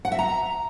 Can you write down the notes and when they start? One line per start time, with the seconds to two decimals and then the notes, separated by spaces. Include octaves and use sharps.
0.05 F#5
0.12 E5
0.19 A#5